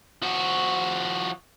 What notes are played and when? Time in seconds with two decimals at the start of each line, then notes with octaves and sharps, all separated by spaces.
0.22 F3 F#4